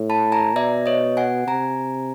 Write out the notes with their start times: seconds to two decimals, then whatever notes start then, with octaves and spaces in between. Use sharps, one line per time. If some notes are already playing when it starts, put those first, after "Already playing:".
Already playing: A2
0.09 A5 B5
0.32 G#5 A#5
0.55 B2 D5 E5
0.86 C#5 D#5
1.17 F#5 G#5
1.47 C3 G#5 A#5